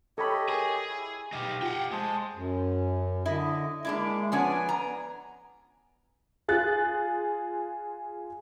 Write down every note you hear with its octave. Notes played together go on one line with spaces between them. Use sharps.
G4 A4 C#5 D#5 B5
G#4 A#4 G#5
E4
B2 D#4 G4 F5
F4 F#5 G5
G#3 C5 A5 D#6
F#2
D3 E4 D#5
G#3 A#3 D4 E4
F3 B3 C#4 D4 G#5
A#5
F4 G#4 F#6 A6